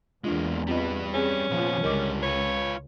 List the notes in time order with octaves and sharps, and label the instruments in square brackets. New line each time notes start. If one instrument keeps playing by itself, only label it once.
[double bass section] E2 [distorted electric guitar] G#3 A#3 [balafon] D4 F4
[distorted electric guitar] G3 B4 [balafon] C4 F4 D#5
[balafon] C4 G#4 G#5 [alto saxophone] C#4
[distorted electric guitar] A#2 B3 [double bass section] F3
[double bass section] C#2 [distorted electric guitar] D3 G3 [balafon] A#4 D#5 D6
[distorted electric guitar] F4 B4 [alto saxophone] C#5